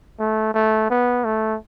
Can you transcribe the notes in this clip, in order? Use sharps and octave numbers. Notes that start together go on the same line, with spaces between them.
A3
A3
B3
A3